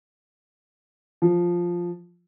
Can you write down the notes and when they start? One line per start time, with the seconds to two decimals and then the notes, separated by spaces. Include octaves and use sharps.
1.22 F3